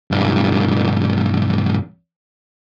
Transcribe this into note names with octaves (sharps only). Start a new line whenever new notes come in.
B1 G2